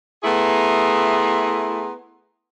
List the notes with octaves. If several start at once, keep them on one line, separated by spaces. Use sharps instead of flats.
A3 B3 E4 G#4 A#5 C6